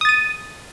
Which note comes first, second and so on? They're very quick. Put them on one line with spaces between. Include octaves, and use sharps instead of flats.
D#6 A6 D#7